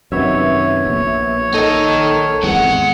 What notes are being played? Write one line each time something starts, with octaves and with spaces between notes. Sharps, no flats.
F#2 C3 D#3 B3 C#5 E5
A#1
D#4 A4 A#4
G#1 E2 G#3 F#5